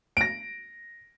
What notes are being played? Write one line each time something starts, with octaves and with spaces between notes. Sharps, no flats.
A#6 D7